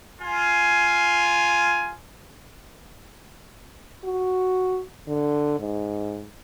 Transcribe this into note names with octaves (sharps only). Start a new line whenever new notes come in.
F4 G#5
F#4
D3
G#2